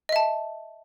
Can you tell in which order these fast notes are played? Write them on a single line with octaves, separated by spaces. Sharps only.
D#5 E5 A5